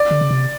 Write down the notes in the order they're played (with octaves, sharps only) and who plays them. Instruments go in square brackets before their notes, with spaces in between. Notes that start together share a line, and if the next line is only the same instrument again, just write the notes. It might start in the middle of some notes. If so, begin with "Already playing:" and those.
Already playing: [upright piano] D5
[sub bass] D3
C#3
C3